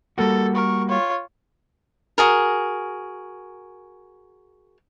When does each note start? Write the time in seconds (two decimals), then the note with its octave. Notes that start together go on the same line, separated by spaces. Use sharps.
0.18 G3 A#3 F#4 A4
0.55 A#4 C#6
0.89 F4 C#5
2.18 F#4 G#4 A#4